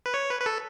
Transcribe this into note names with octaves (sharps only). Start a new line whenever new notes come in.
B4
C#5
B4
B4
A4